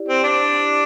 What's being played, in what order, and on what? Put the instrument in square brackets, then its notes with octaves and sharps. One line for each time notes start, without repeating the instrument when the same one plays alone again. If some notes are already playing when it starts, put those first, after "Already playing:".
Already playing: [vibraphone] E4 G4 D5
[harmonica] C4
D4